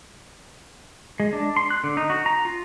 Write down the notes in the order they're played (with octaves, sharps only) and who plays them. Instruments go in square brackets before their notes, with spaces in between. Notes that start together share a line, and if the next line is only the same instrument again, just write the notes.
[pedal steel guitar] G#3
D4
C6
F#6
D3
D#4
F#4
A#5
F4